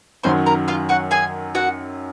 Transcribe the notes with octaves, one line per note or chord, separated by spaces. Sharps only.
F#2 D#3 F#3 C5 C6
A#4 A#5
F4 F5
F#4 F#5
G#4 G#5
F#4 F#5